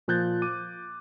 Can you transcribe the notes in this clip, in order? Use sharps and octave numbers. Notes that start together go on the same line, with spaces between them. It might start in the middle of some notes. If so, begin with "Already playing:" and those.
A#2 F3 F#6 G6 A6
D6 D#7